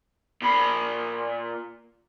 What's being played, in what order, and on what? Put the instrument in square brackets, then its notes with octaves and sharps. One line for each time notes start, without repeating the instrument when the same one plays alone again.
[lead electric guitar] A#2 B5